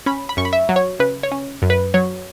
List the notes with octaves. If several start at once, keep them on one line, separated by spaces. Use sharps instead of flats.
C#4 B5
B5
F#2 C#6
B5
E5
F#3
C#5
C#3 B4
C#5
C#4
F#2
B4
F#3 C#5